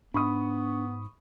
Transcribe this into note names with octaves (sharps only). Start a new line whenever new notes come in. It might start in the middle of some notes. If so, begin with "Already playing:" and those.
G#2 B3 D4 B5 C#6 D#6